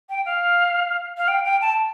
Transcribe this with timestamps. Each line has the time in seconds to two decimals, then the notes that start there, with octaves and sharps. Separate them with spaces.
0.10 G5
0.26 F5
1.17 F5
1.28 G5
1.45 G5
1.61 A5